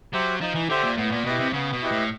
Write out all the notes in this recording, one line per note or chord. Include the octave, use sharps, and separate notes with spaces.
F#3 G4 C5 E5
F3 D#4
E3
D3 G4 C5 E5
A#2
A2 B3
A#2
B2 E4 G4 B4 D#5
C3
C#3 B3
B2
E4 G4 B4 D#5
A2